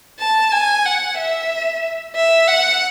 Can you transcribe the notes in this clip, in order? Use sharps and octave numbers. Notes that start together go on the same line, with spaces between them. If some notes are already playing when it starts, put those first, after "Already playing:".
A5
G#5
F#5
E5
E5
F#5